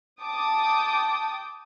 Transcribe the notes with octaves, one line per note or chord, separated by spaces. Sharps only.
G5 A5 D6 D#6